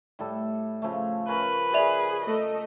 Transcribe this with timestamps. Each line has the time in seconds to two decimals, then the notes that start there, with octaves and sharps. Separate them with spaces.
0.19 A2 G3 A4
0.82 C#3 F3 A3
1.28 C#4 A#4 B4
1.74 G#4 D5 E5 F7
2.25 A3 D#5